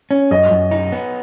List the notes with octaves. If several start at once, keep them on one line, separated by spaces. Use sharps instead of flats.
C#4
F#2 D#5
F#2
D#4
B3